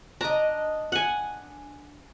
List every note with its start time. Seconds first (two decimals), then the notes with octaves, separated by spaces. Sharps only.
0.21 D4 D#5 A#5
0.92 F#5 G#5